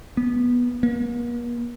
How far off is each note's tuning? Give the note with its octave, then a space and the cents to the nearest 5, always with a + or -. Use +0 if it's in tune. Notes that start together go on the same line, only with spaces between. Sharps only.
B3 -15
A#3 +45